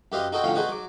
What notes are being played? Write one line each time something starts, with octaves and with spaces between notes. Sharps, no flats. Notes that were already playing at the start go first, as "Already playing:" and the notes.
F#2 G4 B4 D#5 F5 C6
D#4 F#4 A4 D#5 G5 C6
A2 D3 F3 C#4 F5 G5
D#4 F#4 G#4 B4 C5
F#3 D6